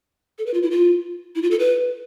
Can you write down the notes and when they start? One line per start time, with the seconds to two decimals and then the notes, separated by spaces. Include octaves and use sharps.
0.38 A4
0.46 B4
0.54 F4
0.63 E4
0.71 F4
1.35 E4
1.42 F4
1.51 A4
1.59 B4